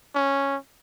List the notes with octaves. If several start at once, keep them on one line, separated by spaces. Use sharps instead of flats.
C#4